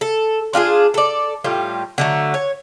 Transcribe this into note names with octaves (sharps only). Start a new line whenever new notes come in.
A4
D4 F4 G4 G#4
A4 D5
A2 G3 F4
D3 F#3 A3
C#5